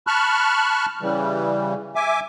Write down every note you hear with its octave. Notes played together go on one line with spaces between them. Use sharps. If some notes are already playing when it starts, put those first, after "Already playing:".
A5 B5 C#6 F6 F#6
C#3 E3 G3
E5 G#5 D6